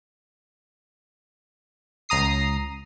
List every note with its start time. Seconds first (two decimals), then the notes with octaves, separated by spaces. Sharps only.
2.09 C#2 A#5 D#6 C7